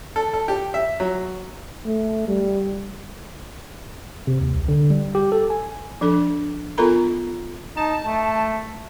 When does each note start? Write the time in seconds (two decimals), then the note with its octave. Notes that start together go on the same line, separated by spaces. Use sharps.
0.16 A4
0.34 A4
0.48 G4
0.74 E5
1.00 F#3
1.86 A3
2.28 G3
4.27 C3
4.41 D#2
4.53 C2
4.68 D3
4.90 G3
5.15 G4
5.32 A4
5.50 G#5
6.01 F3 D4 A4
6.78 B3 F4 A4 A#4 A#5 B5
7.77 D#4 A5
8.06 A3